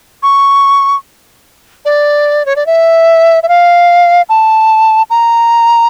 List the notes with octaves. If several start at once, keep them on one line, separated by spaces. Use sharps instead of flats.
C#6
D5
C#5
D5
E5
E5
F5
A5
A#5